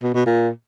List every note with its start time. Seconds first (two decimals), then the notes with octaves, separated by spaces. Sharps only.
0.02 B2
0.14 B2
0.26 A#2